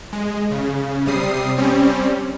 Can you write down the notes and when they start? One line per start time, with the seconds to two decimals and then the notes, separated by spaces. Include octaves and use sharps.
0.13 G#3
0.51 C#3
1.06 C3 G3 D#6 C7
1.57 G3 C4 C#4